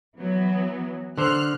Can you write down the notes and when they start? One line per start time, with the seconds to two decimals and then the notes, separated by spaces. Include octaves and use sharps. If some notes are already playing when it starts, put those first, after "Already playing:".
0.16 E3 F#3 B3
1.18 D3 C5 F6 F#6